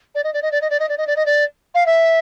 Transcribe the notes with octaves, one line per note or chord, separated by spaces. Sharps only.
D5
D#5
D5
D#5
D5
D#5
D5
D#5
D5
D#5
D5
D#5
D5
F5
E5